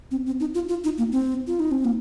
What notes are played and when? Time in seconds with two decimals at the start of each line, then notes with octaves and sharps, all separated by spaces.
0.11 C4
0.26 C4
0.40 D#4
0.55 F4
0.69 F4
0.84 D#4
0.98 A#3
1.12 C4
1.47 F4
1.60 D#4
1.71 C4
1.85 A#3